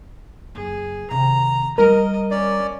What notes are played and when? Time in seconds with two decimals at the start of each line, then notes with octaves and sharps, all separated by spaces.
0.55 F#1 G#4
1.11 C3 D#3 A#5
1.78 G3 E4 A#4 D#5
2.31 C#4 D5